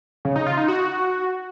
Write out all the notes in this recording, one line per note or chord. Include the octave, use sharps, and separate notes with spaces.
C#3
D#4
F4
D#4
F#4